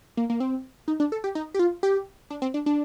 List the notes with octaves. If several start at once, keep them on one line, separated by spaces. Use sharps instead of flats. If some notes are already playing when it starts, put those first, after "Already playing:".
A#3
A#3
C4
D#4
D4
A4
G4
D#4
G4
F4
G4
D4
C4
D4
D4